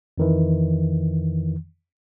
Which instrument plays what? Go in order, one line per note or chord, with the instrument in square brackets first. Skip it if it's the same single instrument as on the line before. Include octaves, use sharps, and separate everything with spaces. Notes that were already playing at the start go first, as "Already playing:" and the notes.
[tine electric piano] F2 D#3 E3